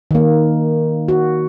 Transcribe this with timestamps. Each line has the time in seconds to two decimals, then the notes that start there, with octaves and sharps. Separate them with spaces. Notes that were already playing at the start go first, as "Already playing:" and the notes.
0.11 D#3 A#3
1.08 F#4